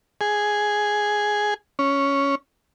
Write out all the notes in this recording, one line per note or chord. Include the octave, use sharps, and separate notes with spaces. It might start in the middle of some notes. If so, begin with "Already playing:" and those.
G#4
C#4